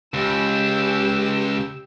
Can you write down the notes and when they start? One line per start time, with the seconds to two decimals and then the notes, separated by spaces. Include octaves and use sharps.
0.14 C#2 G4 E6